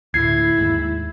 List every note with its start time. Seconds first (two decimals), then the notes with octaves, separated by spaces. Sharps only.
0.14 D2 A2 E4 G#6 C7
0.58 D#2 G#2